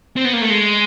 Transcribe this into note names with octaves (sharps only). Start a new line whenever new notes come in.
C4
B3
A#3
A3
G#3